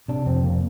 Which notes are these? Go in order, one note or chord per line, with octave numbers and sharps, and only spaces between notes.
C3 D4
F2 C4
C3 A#3